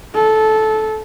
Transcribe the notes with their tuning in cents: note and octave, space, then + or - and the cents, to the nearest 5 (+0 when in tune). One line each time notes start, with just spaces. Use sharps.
A4 -15